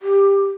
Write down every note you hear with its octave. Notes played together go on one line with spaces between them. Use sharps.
G4